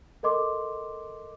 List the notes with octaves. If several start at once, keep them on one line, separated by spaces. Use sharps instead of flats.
A4 A#4 D#5 C6 D6